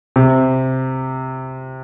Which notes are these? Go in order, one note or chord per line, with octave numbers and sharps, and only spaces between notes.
C3